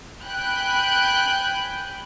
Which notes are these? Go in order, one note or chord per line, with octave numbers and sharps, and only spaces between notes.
G5 G#5 B5 F#6 G6